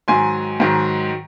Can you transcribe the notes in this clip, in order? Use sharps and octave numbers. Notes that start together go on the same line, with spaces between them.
G#2 D#3 F#3 G#5 C6
G#2 D#3 F#3